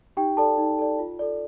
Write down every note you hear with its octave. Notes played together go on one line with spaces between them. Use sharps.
D#4 G4 G5
A4 D5 A5
D#4
A4 D5
F4
A4 D5